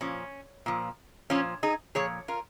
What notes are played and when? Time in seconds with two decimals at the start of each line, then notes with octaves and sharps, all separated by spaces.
0.01 A#2 F3 C#4
0.66 A#2 F3
1.30 A#2 F3 C#4 F4
1.63 D#4 G#4
1.95 A#2 F3 G#4 C#5
2.28 F4 A#4